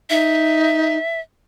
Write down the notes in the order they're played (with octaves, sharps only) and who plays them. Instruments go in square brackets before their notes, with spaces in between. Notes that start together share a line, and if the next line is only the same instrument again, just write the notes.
[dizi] D#4 [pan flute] E5